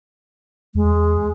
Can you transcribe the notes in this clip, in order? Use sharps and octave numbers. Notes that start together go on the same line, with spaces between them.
E2 G#3